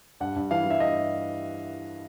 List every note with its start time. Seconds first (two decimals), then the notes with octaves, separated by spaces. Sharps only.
0.20 G2 F#5
0.36 G2
0.51 E3 F5
0.66 E3 E5
0.80 G2 D#5